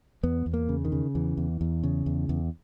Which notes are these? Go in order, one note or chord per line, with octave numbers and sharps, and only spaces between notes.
E2 B3
E2
A#3
C#3
D#3
C#3
E2 E3
E2
E2
C#3
E2
E2